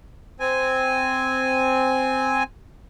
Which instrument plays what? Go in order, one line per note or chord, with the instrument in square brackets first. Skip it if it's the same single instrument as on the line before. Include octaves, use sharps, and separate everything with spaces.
[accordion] C4 G#5